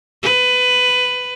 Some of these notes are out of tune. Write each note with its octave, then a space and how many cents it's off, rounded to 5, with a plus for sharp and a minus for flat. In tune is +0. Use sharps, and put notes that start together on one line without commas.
B4 +15